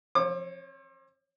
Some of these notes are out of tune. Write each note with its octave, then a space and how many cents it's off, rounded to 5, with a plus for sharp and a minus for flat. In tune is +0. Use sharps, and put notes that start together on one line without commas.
C4 +40 C#5 +0 D6 +40